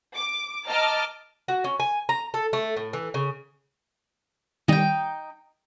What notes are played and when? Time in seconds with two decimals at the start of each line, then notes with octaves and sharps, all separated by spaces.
0.15 D6
0.66 D#5 A5 A#5 D6 F6
1.48 F#4
1.64 C#4
1.80 G#5
2.09 A#5
2.34 A4
2.53 A3
2.77 A2
2.93 E3
3.14 C#3
4.68 D#3 G3 D#4 G5